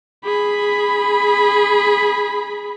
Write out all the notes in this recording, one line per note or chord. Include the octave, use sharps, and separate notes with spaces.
G#4 B5